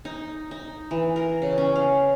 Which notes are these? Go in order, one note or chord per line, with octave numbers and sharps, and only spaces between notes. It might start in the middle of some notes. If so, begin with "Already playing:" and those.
D#4
D#4
E3
A#4
C#3
C#4
F5